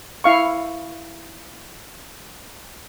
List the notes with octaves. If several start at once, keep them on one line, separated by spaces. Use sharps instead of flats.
E4 F5 C#6